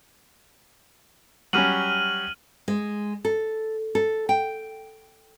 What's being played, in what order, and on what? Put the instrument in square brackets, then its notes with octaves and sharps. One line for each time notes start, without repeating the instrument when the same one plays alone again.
[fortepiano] F#3 G3 C#4 [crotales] F6 D#7 F#7
[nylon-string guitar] G#3
A4
A4
G5